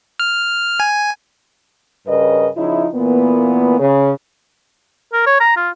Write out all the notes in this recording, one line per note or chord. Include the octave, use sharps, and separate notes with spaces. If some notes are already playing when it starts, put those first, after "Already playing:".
F6
G#5
G2 C#3 A#4 B4 D#5
C#3 F3 D#4 E4
A#2 E3 A#3 B3
C#3
A#4
C#5
A#5
F4